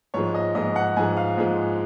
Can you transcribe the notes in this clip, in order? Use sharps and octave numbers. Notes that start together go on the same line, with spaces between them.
G#2 F3 G#3 C#5
D#5
G#2 F3 G#3 D#5
F#5
G#2 F3 G#3 G#5
F5
G#2 F3 G#3